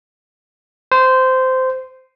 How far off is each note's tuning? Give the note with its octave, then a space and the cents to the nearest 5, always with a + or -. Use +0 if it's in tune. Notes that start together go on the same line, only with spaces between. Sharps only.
C5 -15